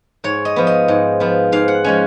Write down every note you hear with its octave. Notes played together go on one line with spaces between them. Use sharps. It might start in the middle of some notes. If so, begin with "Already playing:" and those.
G#2 C#5
D#5
F3 B3
D#5
G#2
F3 B3
G#2 F5
F#5
F3 G#3 C#4 G#5